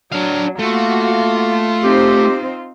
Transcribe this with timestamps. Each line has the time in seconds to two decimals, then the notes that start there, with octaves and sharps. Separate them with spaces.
0.13 F#3 D4 F5
0.59 A3 A#3 F4 F#4
1.83 C4 D#4 G4 C5